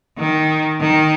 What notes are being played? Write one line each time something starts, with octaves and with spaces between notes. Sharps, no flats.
D#3
D#3